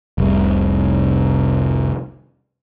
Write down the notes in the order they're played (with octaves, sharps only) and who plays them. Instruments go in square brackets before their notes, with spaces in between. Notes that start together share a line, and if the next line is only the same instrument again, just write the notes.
[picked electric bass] F1 C2